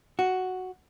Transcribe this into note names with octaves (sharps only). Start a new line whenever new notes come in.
F#4